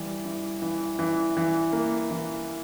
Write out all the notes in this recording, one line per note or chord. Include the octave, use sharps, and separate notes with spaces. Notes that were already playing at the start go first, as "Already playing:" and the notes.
Already playing: E3 G3
E3
E3
E3
E3
A#3
E3